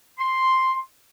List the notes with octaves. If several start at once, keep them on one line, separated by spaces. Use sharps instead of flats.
C6